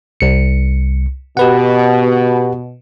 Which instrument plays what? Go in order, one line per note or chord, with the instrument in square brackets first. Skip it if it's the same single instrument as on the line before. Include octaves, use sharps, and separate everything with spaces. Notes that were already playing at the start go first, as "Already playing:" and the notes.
[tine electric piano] C2 C#7
[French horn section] B2 [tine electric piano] G4 B4 F#5